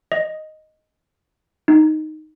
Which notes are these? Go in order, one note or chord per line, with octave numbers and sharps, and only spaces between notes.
D#5
D#4